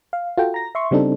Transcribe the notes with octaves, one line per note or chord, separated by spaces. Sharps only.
F5
F4 F#4 A4 G5
A#5 A#6
E5 C6 C#6
C#3 G3 C4 D4 D#4 A4